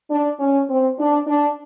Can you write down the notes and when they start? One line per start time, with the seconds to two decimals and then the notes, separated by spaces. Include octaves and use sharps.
0.11 D4
0.40 C#4
0.69 C4
0.99 D4
1.27 D4